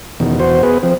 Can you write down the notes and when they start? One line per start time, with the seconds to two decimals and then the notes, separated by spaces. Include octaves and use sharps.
0.20 E2 B2 D#3
0.40 E2 F#4 C5
0.63 B3 G#4 B4
0.83 F3 C4